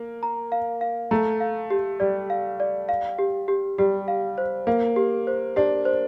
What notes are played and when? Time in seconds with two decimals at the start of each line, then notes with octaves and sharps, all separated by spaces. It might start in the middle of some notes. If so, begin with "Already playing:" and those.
Already playing: A#3
0.23 A#5
0.52 F5
0.81 F5
1.11 A3 A#5
1.40 F5
1.70 G4
2.00 G3 D5
2.30 F5
2.60 D5
2.89 F5
3.19 G4
3.48 G4
3.78 G3 G4
4.08 F5
4.38 C5
4.67 A#3 F5
4.96 G4
5.27 C5
5.56 D4 G4
5.85 C5